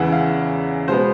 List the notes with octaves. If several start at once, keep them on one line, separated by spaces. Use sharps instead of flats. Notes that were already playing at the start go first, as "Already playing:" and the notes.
Already playing: E2 C#3 E3 G#3 F#5
F5
B2 G#3 B3 C5